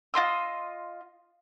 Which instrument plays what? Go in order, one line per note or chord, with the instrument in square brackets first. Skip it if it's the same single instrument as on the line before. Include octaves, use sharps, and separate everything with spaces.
[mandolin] F4 D#5 C6 E6